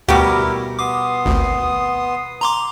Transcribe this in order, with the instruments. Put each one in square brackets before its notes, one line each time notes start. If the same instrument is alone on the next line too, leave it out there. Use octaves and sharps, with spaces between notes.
[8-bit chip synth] D2 D6 [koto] B2 G3 G4 [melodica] E4 A#4
[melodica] B3 C6 D#6 [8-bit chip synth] D6
[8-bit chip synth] G#1 D2
A#5 C6 D6